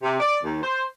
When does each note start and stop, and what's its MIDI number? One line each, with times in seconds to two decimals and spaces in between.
0.02 0.19 48
0.20 0.38 74
0.44 0.62 39
0.63 0.82 72